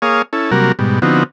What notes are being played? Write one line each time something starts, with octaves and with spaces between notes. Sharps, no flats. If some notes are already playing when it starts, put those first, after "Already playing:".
A#3 G#4 C#5 F5 D#6
C#4 E4 A4
C3 F#3 G3 A#3 F#4 A#4
G#2 B2 G3
D3 F3 B3 C4 D#4 F#4